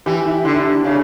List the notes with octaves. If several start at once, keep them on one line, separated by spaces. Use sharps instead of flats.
E3 G4
E4
D3
E4
D4
C#3 D4